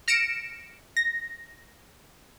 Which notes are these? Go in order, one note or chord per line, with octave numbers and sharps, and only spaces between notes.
F6 A#6 C#7 D7 E7
A#6